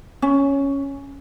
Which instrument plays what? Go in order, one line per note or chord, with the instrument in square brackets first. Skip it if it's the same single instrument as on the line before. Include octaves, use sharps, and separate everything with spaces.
[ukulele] C#4